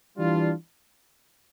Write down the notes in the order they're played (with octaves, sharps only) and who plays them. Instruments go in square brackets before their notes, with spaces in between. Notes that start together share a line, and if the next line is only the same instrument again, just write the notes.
[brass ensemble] E3 G3 D4 F4